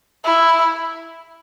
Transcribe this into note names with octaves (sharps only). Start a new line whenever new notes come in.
E4